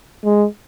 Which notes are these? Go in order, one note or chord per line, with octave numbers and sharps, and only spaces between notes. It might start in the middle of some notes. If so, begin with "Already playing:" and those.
G#3